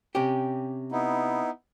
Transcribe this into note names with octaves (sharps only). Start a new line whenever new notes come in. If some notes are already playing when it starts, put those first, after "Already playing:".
C3 C#4 G4
B3 D#4 E4